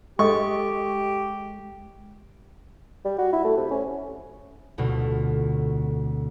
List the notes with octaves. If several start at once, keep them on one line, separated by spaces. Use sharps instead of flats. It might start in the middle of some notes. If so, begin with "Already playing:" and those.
G#3 G4 A4 D#5 C#6
G3
F#4
E4
A3
C3
C#4
F1 D2 B2